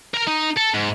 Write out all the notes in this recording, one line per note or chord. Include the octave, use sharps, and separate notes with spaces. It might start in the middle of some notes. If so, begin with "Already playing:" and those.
A#4 A#5
D#4
A4
G#2